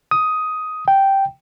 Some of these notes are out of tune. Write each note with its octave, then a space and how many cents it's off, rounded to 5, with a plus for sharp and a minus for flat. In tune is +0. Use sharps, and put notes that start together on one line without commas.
D#6 +10
G5 -5